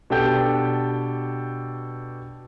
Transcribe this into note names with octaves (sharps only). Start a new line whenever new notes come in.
B2 D4 G4 A4 G5 G6